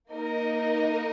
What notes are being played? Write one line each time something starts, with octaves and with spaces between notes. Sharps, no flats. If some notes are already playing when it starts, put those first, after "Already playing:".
A#3 D#4 A#4 D#5